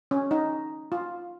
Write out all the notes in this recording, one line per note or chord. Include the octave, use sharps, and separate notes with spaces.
C#4
D#4
F4